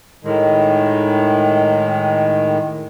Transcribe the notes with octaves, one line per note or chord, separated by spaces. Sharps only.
A2 D#3 G#3